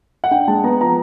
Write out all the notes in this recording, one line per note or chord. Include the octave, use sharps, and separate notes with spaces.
F#5
D4 G5
G#3 A5
B3 A#5
F3 A#5